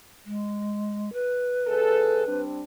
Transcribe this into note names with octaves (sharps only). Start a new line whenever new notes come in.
G#3
B4
D#2 G#4 A4
G3 C4 D4